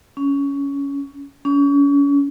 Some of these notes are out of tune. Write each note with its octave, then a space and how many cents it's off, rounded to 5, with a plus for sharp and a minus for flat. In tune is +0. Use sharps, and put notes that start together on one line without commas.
C#4 +15
C#4 +35